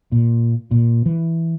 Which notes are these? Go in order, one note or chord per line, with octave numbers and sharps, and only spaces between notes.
A#2
A#2
E3